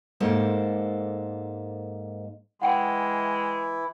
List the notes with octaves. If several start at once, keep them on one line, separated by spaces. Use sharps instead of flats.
G#2 A#3 A4 C5 D5
E3 G#3 E4 F#5 G5